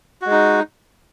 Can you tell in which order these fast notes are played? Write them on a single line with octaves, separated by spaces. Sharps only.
F#4 G#3 D#4